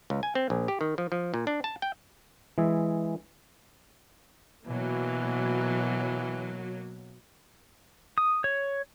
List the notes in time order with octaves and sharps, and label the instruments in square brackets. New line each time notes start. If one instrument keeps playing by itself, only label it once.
[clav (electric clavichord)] C#2
G#5
C4
A#1
G4
D#3
F3
F3
A#2
D4
A5
G5
E3 G#3 G#4 E5
[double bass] B2 [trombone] E3 [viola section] F#3 A#3
[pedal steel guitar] D#6
C#5